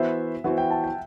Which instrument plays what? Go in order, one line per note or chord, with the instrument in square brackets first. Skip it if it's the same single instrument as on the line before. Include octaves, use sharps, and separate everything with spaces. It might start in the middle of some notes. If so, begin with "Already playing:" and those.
Already playing: [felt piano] E3 B3 F#4 C5 [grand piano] E5
[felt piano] E3 B3 F#4 C5 [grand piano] F#5
[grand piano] G5
A5
G5